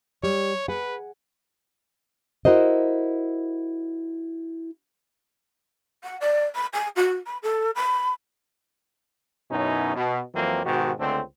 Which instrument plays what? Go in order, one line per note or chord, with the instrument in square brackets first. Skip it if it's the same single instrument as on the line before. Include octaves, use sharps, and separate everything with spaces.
[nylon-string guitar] G3 [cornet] C#5
[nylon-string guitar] G#4 F#5 [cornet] B4
[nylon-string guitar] E4 F#4 A#4 C5 D#5
[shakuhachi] F#5
D5
B5
G#5
F#4
B5
A4
B5
[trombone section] F#2 B2 C#4 D#4 E4
B2
F2 E3 F#3 A#3 C4
G#2 B2 D#3 F#4 G4
C#2 D3 A3 C4